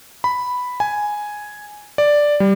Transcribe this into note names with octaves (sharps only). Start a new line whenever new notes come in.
B5
G#5
D5
G3